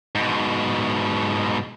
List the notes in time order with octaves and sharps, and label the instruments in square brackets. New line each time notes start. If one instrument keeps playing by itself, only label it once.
[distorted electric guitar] G#2 B2